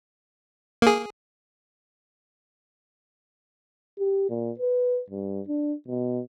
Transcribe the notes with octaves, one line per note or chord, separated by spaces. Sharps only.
A#3 G#4
G4
A#2
B4
G2
D4
B2